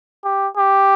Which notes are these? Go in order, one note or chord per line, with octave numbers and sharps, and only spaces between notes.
G4
G4